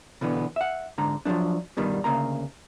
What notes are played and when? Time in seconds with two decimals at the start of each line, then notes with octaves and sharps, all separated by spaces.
0.21 B2 D3 E3 B3
0.56 E5 F#5
0.98 G#2 D3 A#5
1.25 F3 F#3 G#3 A3 D4
1.77 G2 B2 D#3 G3
2.04 D2 C#3 A#3 A#5